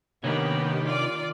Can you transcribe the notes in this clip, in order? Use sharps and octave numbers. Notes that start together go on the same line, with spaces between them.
C3 D#3 A#3 B3 G4 C#5
F4 D5